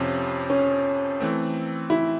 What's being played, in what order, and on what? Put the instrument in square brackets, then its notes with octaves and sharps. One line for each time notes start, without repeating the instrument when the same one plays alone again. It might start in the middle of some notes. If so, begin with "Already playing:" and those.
Already playing: [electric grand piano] F2 C3 F3 [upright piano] C#4
[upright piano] C#4
[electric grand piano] E3 A3 C4
[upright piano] E4